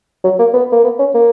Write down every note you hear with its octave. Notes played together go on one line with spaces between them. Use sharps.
F#3
A#3
B3
A#3
B3
C#4
A#3